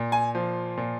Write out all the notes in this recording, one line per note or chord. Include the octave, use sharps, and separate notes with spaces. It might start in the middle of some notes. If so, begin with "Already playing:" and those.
Already playing: A#2
G#5
F3
A#2